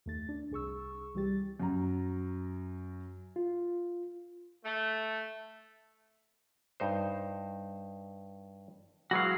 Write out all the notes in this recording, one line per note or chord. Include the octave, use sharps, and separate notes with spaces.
D#2 A3 A6
D4
C2 G#4 C#6 E6
C2 E3 G3 G4 A6
F#2 F#4 A#5
F4
A3
G2 D#4 C5
E3 F#3 G#3 F#4 F5